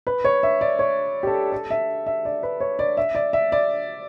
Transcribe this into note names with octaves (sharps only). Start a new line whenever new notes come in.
B4
C#5
E5
D5
C#5
G4
A4
A4
E5
E5
D5
B4
C#5
D5
E5
D5
E5
D5